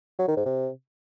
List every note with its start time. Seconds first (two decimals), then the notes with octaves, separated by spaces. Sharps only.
0.19 F#3
0.28 D#3
0.37 G#2
0.46 C3